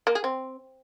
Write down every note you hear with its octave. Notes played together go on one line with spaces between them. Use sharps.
A#3
G#4
C4